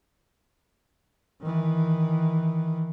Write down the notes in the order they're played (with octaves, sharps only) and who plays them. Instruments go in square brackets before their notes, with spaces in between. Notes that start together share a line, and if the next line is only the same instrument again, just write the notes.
[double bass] D#3 E3